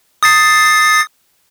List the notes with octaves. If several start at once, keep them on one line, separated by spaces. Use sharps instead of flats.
D#6 A6 C7